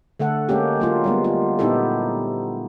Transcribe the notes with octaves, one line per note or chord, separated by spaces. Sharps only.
D3 A3 A4 F#5
G#3 A#3 C#4 G4
F#3 A#3 F4
G3 G#3 B3
F4
A#2 B3 D#4 E4 G4 A4